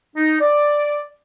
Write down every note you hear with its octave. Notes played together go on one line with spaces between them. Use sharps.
D#4
D5